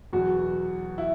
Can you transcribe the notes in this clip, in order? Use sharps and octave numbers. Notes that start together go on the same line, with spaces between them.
E2 B2 F#3 F#4
E4